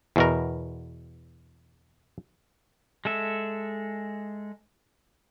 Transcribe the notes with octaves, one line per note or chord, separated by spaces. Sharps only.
E2 B2 A#4
G#3 A4 E5